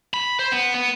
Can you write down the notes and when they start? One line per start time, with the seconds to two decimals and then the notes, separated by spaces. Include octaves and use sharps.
0.14 B5
0.39 C5
0.52 B3
0.75 B3